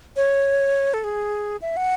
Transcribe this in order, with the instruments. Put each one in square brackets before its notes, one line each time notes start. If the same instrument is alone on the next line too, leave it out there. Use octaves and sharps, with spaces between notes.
[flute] C#5
A4
G#4
E5
F#5